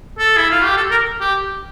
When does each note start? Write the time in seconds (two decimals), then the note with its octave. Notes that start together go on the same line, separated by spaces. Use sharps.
0.19 A4
0.37 E4
0.50 F4
0.64 G4
0.77 A4
0.91 A#4
1.21 G4